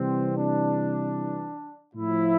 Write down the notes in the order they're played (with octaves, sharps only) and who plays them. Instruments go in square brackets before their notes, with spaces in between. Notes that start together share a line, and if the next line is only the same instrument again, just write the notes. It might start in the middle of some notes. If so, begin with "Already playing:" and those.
Already playing: [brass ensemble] C3 E3 G3 C4
D4
A2 F3 E4